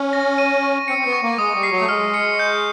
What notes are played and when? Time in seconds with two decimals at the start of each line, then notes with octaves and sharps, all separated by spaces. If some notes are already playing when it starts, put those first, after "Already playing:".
Already playing: C#4
0.13 A#6
0.38 D#7
0.63 C#6
0.88 C4 C#7
0.98 C4
1.06 B3
1.13 C#6
1.22 A#3
1.38 G#3 D#6
1.55 G3
1.63 C7
1.71 F#3
1.81 A3
1.89 G#3 F6
2.14 C#7
2.39 G6